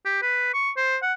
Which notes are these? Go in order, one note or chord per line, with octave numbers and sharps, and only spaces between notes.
G4
B4
C#6
C5
F#5